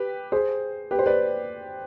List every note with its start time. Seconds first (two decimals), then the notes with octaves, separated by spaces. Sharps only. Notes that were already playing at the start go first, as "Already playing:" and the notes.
Already playing: G4 B4
0.32 G#4 C5
0.91 G4 B4
0.99 C5
1.06 B4 D5